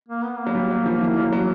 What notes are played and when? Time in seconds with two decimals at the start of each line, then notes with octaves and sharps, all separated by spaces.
0.08 A#3
0.24 B3
0.39 A#3
0.47 F#3
0.55 G3
0.70 F#3
0.86 F3
1.01 E3
1.17 F#3
1.32 F#3